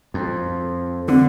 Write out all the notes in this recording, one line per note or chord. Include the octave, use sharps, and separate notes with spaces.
F2
D3 C4